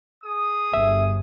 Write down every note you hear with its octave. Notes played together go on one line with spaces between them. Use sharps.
G#4 D#6
G1 E5